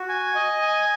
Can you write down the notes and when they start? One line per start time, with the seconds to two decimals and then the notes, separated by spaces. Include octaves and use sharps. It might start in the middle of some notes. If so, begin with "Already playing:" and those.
Already playing: F#4
0.09 G#5
0.35 D#5
0.62 G#5